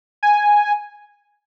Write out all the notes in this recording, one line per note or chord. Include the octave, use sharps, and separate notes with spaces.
G#5